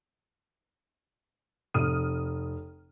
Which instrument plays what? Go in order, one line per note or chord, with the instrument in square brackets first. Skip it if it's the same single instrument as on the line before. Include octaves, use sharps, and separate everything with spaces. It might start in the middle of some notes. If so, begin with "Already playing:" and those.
[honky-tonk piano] F1 D#6 F6 D#7